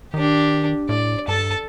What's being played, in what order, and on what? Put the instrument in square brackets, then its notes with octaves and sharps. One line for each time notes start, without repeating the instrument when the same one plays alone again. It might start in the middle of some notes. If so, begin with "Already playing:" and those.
[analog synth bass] D#3 [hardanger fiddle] D4 G4
[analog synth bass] A2 [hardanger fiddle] D5
[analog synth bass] G2 [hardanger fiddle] A4 A5